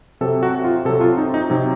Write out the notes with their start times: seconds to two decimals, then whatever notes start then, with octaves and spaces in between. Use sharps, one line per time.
0.21 C3 F#3 A4
0.43 F#4
0.64 F4
0.85 C3 A4
0.89 F#3
1.01 F4
1.18 D#4
1.34 D#4
1.50 C3 F#3